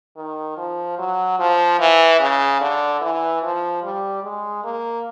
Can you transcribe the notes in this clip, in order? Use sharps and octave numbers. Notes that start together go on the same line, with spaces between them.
D#3
F3
F#3
F3
E3
C#3
D3
E3
F3
G3
G#3
A#3